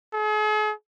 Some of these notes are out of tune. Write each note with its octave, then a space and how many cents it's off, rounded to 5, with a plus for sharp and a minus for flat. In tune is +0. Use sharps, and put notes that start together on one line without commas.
G#4 +45